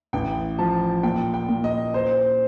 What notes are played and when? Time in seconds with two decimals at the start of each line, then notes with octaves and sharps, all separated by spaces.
0.13 A1 G5
0.59 F3 A5
1.03 A#2 G5
1.34 G5
1.49 A#2
1.64 D#5
1.94 C5